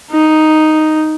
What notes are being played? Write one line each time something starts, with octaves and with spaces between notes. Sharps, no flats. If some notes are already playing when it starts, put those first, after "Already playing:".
D#4